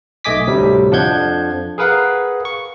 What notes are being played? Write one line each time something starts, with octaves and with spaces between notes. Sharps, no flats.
B1 A3 D#5 G#5 D6 B6
D2 A2 C3 G3
F2 F3 D4 F#5 G6 G#6
G#4 A#4 B4 F5 F#5
C#6